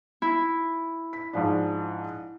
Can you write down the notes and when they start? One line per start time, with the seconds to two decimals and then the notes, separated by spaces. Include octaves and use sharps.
0.22 E4
1.13 B6
1.33 G#2 F3 D4